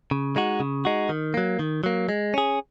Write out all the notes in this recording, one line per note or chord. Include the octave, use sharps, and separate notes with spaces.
C#3
G#3 D#4 F#4
C#3
G#3 D#4 F#4
D#3
F#3 A#3
D#3
F#3 A#3
G#3
C#4 G#4